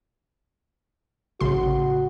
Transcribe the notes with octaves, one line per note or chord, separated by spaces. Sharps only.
A1 C#3 F#4 C6